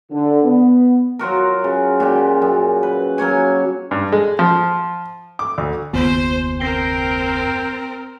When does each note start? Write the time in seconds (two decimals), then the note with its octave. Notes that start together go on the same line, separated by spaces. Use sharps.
0.12 D3
0.45 B3
1.19 F#3 F4 F#4 A#4
1.64 C#3
2.00 A#2 F#4 G4
2.42 F#2
2.83 B4
3.18 F#3 A#3 C#5 G#5
3.91 G2
4.12 G#3
4.39 F3
5.39 D6
5.58 D2
5.93 F#1 D#2 B3 C5
6.60 C4 A#4 G5 A#6 C7 G7